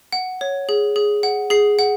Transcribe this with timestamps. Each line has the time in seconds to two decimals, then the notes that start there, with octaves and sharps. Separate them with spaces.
0.13 F#5
0.41 C#5
0.69 G#4
0.96 G#4
1.23 F#5
1.50 G#4 C7
1.79 F#5